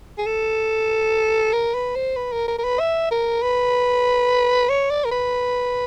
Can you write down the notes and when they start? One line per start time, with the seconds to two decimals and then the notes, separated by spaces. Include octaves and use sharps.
0.18 G#4
0.26 A4
1.53 A#4
1.74 B4
1.96 C5
2.16 B4
2.32 A#4
2.48 A#4
2.59 A#4
2.64 B4
2.80 E5
3.11 A#4
3.42 B4
4.69 C#5
4.90 D5
5.05 A#4
5.12 B4